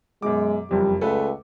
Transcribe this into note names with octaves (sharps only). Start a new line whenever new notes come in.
F#2 B2 G#3 D6
F#1 F2 G3
C#2 A3 A4 B4